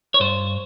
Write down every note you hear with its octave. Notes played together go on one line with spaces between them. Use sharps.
C#5
G2 C5